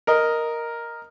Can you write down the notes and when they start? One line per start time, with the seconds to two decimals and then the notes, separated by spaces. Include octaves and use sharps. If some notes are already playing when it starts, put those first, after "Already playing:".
0.07 A#4 D#5